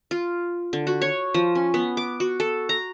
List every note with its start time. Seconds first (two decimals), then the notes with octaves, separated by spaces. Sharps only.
0.11 F4
0.73 D3
0.87 F#4
1.02 C#5
1.34 F3
1.55 C#4
1.74 B3
1.97 D6
2.20 F#4
2.40 A4
2.69 A#5